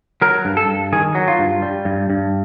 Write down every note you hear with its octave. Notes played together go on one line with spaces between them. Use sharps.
F#3 A#4
G2
A4
G2
D#3 G#4
F#3
F4
G2
G3
G2
G2